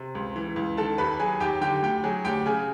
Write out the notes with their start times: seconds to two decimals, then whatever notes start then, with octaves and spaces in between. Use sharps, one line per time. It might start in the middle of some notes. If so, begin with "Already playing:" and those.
Already playing: C3
0.15 C#2
0.36 E3
0.56 C#2
0.77 D#3 A4 A5
0.98 D#2 B4 B5
1.20 F#3 G#4 G#5
1.40 D#2 G4 G5
1.61 D3 G4 G5
1.82 D2 G4 G5
2.04 F#3 G#4 G#5
2.25 D2 G4 G5
2.46 C#3 G#4 G#5